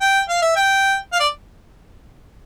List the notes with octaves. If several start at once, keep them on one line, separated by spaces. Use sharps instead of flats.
G5
F5
E5
G5
F5
D5